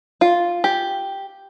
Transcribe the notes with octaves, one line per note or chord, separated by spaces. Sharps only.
F4
G4